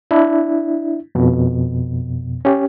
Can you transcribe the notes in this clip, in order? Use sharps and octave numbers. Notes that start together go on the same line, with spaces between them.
D4 E4
F2 B2
C#4 G4